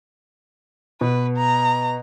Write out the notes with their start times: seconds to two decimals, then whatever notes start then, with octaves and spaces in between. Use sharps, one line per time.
1.01 B2 B4
1.37 A#5